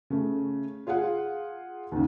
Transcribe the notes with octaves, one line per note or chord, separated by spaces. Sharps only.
C#3 A3
F4 G#4 F5 F#5
D#2 C#3